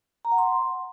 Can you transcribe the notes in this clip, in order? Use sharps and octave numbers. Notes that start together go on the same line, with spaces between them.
A#5
F#5
C6